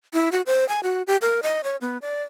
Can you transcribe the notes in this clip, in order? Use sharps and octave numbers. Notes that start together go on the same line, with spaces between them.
E4
F#4
C5
G#5
F#4
G4
A#4
D#5
C#5
B3
D5